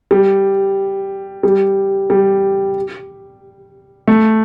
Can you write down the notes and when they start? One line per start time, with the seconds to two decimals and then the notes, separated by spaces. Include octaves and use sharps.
0.11 G3
1.43 G3
2.10 G3
4.08 A3